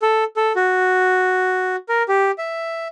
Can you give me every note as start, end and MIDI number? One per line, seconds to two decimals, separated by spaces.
0.02 0.24 69
0.36 0.53 69
0.56 1.76 66
1.89 2.03 70
2.08 2.31 67
2.38 2.88 76